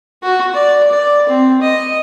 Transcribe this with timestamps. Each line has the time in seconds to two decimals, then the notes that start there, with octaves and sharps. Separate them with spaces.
0.23 F#4
0.54 D5
0.90 D5
1.29 C4
1.61 D#5